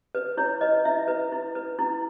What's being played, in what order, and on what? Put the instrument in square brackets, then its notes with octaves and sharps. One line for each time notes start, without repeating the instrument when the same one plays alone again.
[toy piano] B4
E4 C#5
B4 D#5
E4 E5
B4
E4
B4
E4